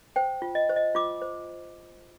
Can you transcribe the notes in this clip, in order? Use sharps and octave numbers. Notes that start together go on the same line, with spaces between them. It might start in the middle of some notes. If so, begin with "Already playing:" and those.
C5 G5
F4
D#5
C5
D#5
F4 D6
C5